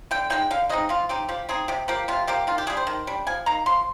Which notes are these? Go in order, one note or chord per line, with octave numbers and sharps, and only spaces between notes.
D3 G5
G#3 C4 D#4 G5
D3 F5
G#3 C4 D#4 D#5
F3 F4
C4 D#4 G4
F3 G4
C4 D#4 G#4
C3 G4
F3 A#3 G4
C3 F4
F3 A#3 G4
D#3 F4
G4
G3 D4 G#4
C5
D#3
G3 D4
F3 G#5
A#3 D#4 A#5
F3 C6